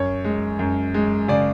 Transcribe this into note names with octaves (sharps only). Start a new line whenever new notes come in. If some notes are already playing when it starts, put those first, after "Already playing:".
Already playing: F#2 C#5
G#3
F#2
G#3
C#3 D5